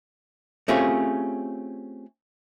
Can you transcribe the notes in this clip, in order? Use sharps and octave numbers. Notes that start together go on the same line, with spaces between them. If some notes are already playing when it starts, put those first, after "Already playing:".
A3 C4 C#4 F4 G4 G#4